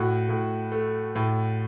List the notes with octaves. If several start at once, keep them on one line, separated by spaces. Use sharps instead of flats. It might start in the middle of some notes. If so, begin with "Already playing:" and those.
Already playing: A2 F#4
A2
A3
A2